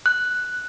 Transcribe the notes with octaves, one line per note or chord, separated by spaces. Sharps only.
F#6